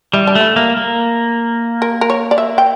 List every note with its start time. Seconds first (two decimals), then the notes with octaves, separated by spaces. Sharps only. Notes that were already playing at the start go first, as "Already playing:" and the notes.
0.13 G3 E4
0.27 D4
0.35 A3
0.41 E4
0.56 A#3
0.77 A#3
1.82 A#4
2.01 A#4
2.10 C#5
2.31 D5
2.38 E5
2.58 G5